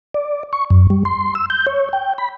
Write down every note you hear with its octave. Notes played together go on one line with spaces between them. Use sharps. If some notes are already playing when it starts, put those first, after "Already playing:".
D5
C#6
F#2
G3
C6
E6
G6
C#5
G5
B5